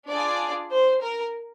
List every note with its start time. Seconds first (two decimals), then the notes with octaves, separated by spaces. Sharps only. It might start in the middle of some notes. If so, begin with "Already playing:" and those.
0.10 D4 F4 G#4 D5
0.71 C5
1.01 A#4